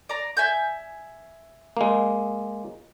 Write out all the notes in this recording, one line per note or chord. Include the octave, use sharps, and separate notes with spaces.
D5 A#5
E5 G#5 G6
G#3 A#3